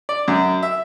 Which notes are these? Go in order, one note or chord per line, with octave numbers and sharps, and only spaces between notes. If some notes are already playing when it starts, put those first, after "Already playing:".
D5
F#2
E5